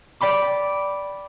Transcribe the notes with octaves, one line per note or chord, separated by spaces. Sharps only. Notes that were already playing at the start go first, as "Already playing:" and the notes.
D5 G5 B5 D6